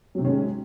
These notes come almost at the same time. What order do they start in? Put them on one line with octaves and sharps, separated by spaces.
F#3 C3 D#3 C#4 G#3